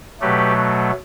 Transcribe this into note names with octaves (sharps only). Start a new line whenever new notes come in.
B2 F#3 A3 G4 B4